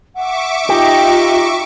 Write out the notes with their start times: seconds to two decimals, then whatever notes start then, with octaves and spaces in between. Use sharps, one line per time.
0.15 E5 F#5 C#6 D6
0.69 D#4 F4 G4